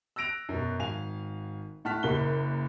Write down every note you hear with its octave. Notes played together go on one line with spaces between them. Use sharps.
E6 F#6 A#6 D7 F7
F#2 B2
G#1 F5 G#5 F7
A2 F#5 A5 F6 F#6 B6
F#1 F#2 A#3 G7